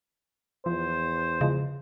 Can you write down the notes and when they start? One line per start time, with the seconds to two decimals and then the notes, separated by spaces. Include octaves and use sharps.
0.66 E2 F3 C5
1.41 C#3 F3 G#3